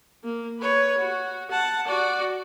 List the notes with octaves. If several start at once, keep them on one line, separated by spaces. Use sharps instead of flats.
A#3
B4 C#5
F#4
F#5 A5
F#4 D5